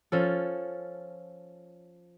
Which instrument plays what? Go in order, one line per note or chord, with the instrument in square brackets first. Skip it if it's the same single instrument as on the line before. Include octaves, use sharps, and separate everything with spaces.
[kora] F3 C#4 A4